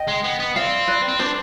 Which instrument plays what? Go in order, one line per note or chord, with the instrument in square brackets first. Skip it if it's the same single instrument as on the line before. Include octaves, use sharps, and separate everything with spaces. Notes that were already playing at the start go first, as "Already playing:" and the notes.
Already playing: [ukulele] D#5 G5
[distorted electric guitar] G#3
B3
B3
[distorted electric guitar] C4 [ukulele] D5 F5
[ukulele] B4 D5
[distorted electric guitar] C4
[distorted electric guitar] D4 [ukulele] C5